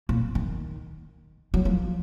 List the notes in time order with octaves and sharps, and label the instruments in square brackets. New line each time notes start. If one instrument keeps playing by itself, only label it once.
[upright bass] A#2
D#3
F#3
F3